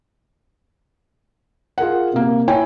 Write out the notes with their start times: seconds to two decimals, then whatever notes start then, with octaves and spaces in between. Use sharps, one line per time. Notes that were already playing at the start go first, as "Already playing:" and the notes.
1.78 F4 G#4 A#4 F#5
2.13 C3 A#3
2.48 E4 C#5 G5 G#5